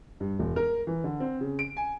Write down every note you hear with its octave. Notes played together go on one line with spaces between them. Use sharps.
G2
E1
A#4
E3
D3
C4
C#3
D7
G#5